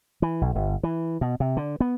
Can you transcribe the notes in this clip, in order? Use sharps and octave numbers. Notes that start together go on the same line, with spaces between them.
E3
B1
G1
E3
B2
C3
D3
B3